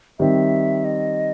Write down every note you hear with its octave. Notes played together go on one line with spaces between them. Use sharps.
D#3 G3 C4 E5
D#5